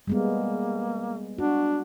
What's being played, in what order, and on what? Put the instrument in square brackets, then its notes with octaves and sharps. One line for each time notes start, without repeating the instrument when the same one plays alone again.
[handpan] G3 G#3 B3 [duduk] A#3
[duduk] D4 [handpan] F#4